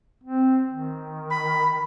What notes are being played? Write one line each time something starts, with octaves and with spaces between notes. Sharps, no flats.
C4
D#3
B5